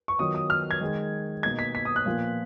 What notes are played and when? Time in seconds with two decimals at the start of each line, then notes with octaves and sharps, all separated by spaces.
0.08 C#6
0.19 D#3 F#3 B3 F4 D#6
0.35 D#6
0.50 F6
0.71 G#6
0.81 D#3 G#3 D#4
1.43 B2 A#3 D#4 G#6
1.59 B6
1.75 B6
1.85 D#6
1.96 F#6
2.06 A#2 F3 B3 F4